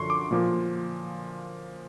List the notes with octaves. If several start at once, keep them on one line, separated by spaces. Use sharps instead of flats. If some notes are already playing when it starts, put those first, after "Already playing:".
Already playing: F#2 D3 F3 C6 C#6
D6
A#2 F3 A#3